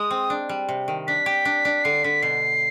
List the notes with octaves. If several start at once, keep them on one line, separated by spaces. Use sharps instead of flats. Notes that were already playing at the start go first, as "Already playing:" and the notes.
Already playing: G#3 D#6
C4
D4
G3
C3
D#3
D4 B6
G4
D4
D4
D3 C7
D3 B6
B2 C7